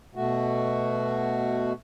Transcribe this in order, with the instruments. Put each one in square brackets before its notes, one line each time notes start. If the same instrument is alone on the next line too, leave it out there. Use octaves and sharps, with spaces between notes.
[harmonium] B2 A3 F#4